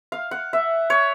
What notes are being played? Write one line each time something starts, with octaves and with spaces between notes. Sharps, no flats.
F5
F#5
E5
C#5